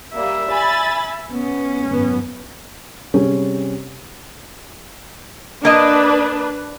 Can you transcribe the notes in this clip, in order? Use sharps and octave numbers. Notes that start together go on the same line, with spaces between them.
G3 A#3 E5
G#5 B5 A6
B3 C#4
G#1 F#2 B3
C3 G3 C4 C#4 G#4
A#3 D4 B4 D#5